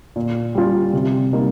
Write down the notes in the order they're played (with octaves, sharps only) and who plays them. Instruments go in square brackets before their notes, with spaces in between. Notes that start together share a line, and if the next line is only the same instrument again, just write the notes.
[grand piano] A#2
G3 C#4 F4
C3
G3 A#3 D#4